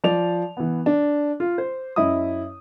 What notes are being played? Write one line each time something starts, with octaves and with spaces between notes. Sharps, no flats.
F3 D5 F7
E3 B3
D4
F4
C5
F#2 E4 D#5 D#6